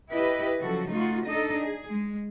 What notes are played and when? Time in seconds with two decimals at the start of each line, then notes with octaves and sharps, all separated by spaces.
0.13 E4 G4 B4 D#5
0.60 C#3 F3 F#3 F#4 A4
0.90 A3 D#4 F4 F#4
1.26 D4 D#4 A4 D#5
1.61 G#4
1.92 G#3